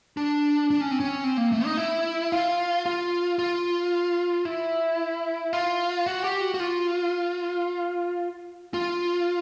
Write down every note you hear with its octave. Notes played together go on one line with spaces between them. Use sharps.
D4
D4
C#4
C4
C#4
C4
A#3
A3
D#4
E4
F4
F4
F4
E4
F4
F#4
G4
F#4
F#4
F4
F4